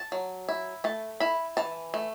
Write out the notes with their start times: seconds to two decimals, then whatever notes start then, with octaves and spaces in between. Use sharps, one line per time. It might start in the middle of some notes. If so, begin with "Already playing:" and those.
Already playing: A5
0.12 F#3
0.48 E4
0.84 A3 A5
1.20 E4 B5
1.57 E3 A5
1.94 A3